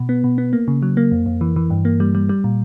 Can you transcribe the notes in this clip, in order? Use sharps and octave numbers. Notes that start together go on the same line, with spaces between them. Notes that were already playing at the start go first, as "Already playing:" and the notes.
Already playing: B2
B3
B2
B3
A#3
C#3
F#3
A#3
F2
F2
E3
E3
G2
A#3
G3
G3
G3
A#2